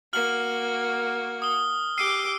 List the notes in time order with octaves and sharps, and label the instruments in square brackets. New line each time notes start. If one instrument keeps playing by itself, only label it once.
[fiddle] A#3 F#4 [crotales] F6 F#7
[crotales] D#6 G7
[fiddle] G4 D6 [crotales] E6 C7 D#7